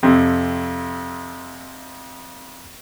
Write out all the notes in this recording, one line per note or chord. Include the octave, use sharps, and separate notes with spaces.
F2 C3